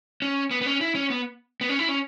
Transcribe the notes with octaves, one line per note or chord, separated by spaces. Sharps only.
C#4
B3
B3
C#4
E4
C#4
B3
B3
C#4
E4
C#4